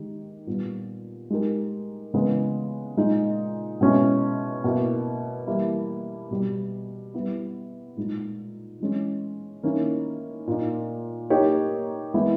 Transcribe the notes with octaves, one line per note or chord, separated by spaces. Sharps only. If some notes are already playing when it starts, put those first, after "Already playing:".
Already playing: D#3 G#3 G4
A#2 G3 B3
G#3 D#4 G4 A#4
C#3 E3 G#3 B3
A#2 G#3 D#4
B2 G#3 C#4 E4
B2 A#3 E4
E3 G3 A#3 E4
B2 G3 B3
G3 B3 E4
A#2 G#3 D#4
E3 G#3 C#4
D#3 A#3 C#4 E4
A#2 A#3 D#4
A#3 D#4 G4 A#4 C#5
E3 G#3 B3 E4